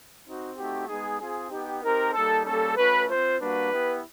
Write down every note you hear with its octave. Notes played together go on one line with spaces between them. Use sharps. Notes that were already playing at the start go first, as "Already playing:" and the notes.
C4 D#4 F#4
A3 C4 D#4 F#4 G4
G#3 B3 D#4 G#4
C4 F4 G#4
B3 D#4 G4
C4 D#4 G4 A#4
G3 A#3 D#4 A4
G3 A#3 C#4 A4
A3 C#4 F#4 B4
C4 F4 C5
G3 A#3 D4 F#4 B4
B3 E4 G4